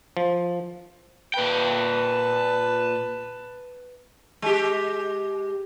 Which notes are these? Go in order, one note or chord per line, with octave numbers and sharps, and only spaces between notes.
F3
A#2 B4 G5 A5
G#3 G4